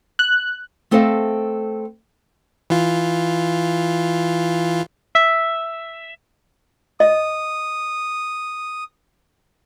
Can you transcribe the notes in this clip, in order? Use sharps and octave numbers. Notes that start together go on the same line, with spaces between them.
F#6
A3 C4 A4 C5 D#5 F5
E3 F4
E5
D#5 D#6